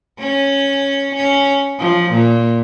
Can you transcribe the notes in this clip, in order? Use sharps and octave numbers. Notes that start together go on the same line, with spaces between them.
C#4
C#4
F3
A#2